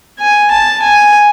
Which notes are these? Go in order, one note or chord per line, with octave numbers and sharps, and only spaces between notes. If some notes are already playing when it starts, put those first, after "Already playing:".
G#5
A5
G#5